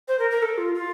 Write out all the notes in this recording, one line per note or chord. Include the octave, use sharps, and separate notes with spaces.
C5
A#4
A#4
A4
F4
F4